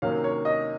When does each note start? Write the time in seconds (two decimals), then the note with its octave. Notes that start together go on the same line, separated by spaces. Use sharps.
0.02 C3 D#3 F#3 A#3 C#4 F5
0.24 C#5
0.45 D#5